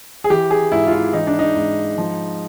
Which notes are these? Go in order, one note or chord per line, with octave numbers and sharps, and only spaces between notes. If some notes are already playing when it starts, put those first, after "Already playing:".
G#4
E3 G4
G#4
G#2 E4
F4
E4
E3 D#4
D4
D#4
G#2
F3